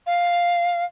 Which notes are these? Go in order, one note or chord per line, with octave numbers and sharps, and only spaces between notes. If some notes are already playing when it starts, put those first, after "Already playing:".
F5